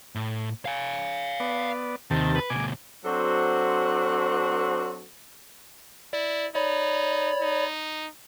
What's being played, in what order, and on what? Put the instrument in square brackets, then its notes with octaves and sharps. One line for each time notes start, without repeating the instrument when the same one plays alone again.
[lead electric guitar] A2
F5 G#5
[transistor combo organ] B3 D5
[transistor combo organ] D#2 C3 A5 [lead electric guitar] D#3
[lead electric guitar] B4
[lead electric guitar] D2 B2 [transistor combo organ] G#5 D6
[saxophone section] F#3 C4 D4 F#4 A4 C5
[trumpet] E4 [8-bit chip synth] D5
[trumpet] D#4 [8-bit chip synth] C#5 D5 B5
[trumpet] D#4